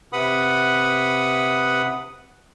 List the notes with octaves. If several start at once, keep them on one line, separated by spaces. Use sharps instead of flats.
C3 B4 F#5 B5 D#6